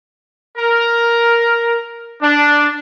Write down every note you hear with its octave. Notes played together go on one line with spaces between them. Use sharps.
A#4
D4